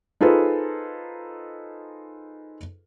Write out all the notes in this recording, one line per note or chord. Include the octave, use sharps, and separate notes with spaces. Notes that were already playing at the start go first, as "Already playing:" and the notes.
D#4 F4 G#4 A4 B4 C5